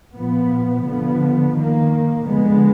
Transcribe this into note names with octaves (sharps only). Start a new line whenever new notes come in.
A#2 F3 B3
D3 F3 B3
D#3 A#3
D3 F3 G#3 B3